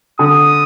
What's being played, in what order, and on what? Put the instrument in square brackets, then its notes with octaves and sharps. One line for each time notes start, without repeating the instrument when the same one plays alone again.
[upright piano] D3 [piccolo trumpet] D#6